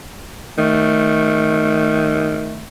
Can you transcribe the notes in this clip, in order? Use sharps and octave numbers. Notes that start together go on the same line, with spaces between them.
D#3 A3